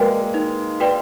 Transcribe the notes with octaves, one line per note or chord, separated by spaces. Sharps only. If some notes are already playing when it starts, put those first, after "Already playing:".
Already playing: G#3 A#3 F#4 B4 D5 G5
D#4
F#4 B4 D5 G5